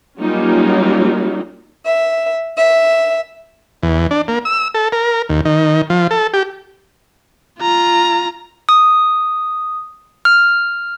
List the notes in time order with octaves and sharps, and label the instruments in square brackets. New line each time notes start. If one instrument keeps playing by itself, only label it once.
[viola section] F#3 G3 A#3 C#4 D#4 F4
[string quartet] E5
E5
[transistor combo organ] E2
D4
A#3
E6
A4
A#4
D#2
D#3
F3
A4
G4
[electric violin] F4 A#5
[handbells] D#6
F6